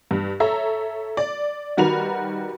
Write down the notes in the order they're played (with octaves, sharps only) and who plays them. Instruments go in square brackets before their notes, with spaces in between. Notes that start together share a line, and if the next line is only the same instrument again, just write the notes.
[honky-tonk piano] G2
A4 C#5 E5 A#5
D5
D#3 G3 F#4 A#4 B4 F7